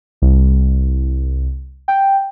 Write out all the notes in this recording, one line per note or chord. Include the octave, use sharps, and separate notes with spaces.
C2
G5